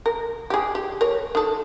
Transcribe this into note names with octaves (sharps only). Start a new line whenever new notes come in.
A#4
G4 G#4
G4
A#4 C#5
D#3 A4